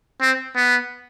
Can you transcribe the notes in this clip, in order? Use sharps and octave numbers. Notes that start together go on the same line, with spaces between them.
C4
B3